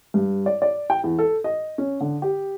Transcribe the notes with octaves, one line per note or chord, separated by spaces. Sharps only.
G2
D5
D5
G5
E2
A4
D#5
C#4
D3
G4